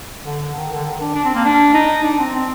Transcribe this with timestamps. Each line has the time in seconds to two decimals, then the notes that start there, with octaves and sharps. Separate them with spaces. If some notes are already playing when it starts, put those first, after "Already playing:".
0.24 D3
0.55 D#3
0.74 D3
0.85 D#3
1.00 D4
1.15 D4
1.25 C4
1.35 A#3
1.45 D4
1.74 D#4
2.04 D4
2.19 C4
2.35 C4